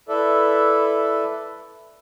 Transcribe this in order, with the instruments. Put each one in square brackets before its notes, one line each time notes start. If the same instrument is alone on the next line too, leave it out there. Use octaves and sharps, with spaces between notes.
[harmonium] E4 A4 B4 D5 E5